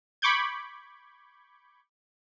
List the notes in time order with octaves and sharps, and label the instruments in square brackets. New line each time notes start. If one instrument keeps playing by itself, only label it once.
[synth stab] B5 C#6 D6 G6 G#6